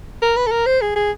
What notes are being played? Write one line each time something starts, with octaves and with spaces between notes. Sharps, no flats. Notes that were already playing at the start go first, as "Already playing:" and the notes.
A#4
B4
A4
A#4
C5
G#4
G#4